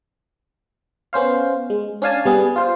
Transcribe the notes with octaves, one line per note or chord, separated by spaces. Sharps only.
B3 C#4 C5 F5
G#3
C#4 D4 F5 G#5 A5
G3 B3 G#4
F4 C5 F5